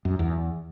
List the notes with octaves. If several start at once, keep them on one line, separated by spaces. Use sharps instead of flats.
F#2
E2